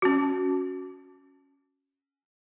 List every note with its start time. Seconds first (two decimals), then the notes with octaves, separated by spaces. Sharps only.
0.02 C#4 F#4